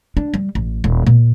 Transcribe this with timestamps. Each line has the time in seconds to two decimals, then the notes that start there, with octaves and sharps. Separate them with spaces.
0.17 D4
0.34 G3
0.55 A1
0.84 D#1
1.07 A#2